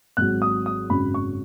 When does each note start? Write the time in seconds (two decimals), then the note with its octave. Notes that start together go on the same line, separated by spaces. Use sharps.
0.17 G#1 G#2 F#3 F#6
0.42 D#6
0.66 D#6
0.90 G#1 F#2 C#3 F#3 B5
1.14 C#6